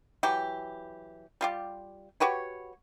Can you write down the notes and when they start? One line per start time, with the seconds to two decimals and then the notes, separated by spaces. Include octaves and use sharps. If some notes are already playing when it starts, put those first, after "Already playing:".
0.23 E3 F#3 G4
1.41 G3 F4 G4
2.20 F#4 G4 B4 C#5